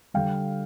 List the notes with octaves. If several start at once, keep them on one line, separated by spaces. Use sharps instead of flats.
D3 G3 F5 G5